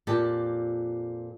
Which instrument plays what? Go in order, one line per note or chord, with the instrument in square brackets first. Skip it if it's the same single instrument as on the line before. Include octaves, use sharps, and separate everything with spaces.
[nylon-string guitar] F2 A#2 G4 A5